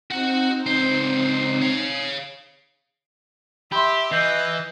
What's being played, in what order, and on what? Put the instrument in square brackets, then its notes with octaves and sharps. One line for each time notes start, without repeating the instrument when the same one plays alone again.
[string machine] C4 D#4 [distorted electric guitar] F#4 F#5
[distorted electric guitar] C#2 C5
C#5 F5
[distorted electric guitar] G4 [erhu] E5 [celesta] B5 C6
[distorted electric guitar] E3 [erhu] D#5 [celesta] G6 C7